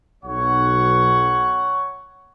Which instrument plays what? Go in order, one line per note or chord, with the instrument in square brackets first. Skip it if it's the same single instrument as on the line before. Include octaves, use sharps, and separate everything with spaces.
[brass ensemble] B1 [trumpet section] C#5 F#5 C#6